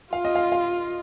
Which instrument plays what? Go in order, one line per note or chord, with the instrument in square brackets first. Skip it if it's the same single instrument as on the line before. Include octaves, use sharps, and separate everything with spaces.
[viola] F4 [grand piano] F5
[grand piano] D#5
F5
F5